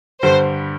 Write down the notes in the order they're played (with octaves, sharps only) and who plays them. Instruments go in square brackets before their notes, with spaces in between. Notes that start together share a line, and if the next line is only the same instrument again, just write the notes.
[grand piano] G2 D3 G3 [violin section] C5